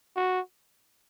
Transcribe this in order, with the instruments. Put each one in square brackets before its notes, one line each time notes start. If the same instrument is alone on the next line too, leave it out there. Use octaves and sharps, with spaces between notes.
[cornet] F#4